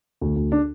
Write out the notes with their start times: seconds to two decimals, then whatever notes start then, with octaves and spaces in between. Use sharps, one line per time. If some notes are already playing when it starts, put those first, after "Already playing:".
0.21 D2
0.36 D2
0.52 D4